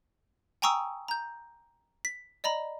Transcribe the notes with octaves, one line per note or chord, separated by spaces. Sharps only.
G5 G#5 A#5 C#6 D#6 E6
A#5 G6
B6
D5 D#5 A#5 B5